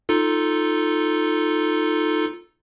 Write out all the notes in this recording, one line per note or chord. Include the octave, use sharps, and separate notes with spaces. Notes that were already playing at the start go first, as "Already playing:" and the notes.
D#4 F4 A4